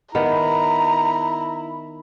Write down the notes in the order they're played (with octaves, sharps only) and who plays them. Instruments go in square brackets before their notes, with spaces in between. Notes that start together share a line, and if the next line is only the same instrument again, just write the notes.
[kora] D#3 B3 [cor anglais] E4 [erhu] A#5